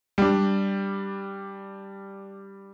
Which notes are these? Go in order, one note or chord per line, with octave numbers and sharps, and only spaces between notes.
G3 D4